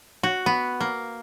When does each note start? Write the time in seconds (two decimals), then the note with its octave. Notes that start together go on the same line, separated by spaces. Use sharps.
0.23 F#4
0.46 B3
0.80 A#3